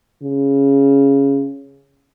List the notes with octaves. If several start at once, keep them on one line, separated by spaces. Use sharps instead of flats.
C#3